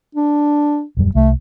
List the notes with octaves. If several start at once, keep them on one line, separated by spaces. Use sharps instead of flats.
D4
D#1 F#2 G3
C2 A3